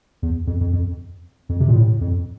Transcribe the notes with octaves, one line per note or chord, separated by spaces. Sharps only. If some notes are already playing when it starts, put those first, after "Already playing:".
E2
F2
F2
F2
F2
C3
A#2
A2
F2